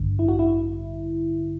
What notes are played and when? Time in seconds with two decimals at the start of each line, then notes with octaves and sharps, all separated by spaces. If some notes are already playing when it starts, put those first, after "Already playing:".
Already playing: A1 G2 D3
0.19 E4
0.28 F#4
0.39 E4